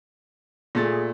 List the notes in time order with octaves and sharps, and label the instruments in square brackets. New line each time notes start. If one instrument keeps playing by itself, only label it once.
[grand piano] A#2 A3 A6 [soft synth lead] G#4